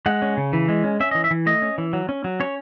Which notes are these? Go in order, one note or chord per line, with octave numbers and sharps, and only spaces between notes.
G#3 F#5
C#4
C#3
E3
G#3
C#4
C#4 E5
E3 D#5
E5
E3
A3 D#5
C#4
E3
F#3
C#4
F#3
C#4 C#5